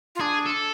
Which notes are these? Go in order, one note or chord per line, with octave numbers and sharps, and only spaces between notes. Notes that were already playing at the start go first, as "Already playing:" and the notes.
F4
D4 G#4
A4